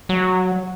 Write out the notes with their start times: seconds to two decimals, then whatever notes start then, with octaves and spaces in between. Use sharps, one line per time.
0.09 F#3